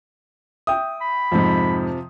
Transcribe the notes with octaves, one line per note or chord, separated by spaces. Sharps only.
E5 G5 D#6
B5
F2 G#2 C3 F3